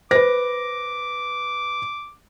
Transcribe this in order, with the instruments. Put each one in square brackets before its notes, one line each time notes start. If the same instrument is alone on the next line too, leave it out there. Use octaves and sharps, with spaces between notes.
[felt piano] B4 A#6 [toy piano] C5 [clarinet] D6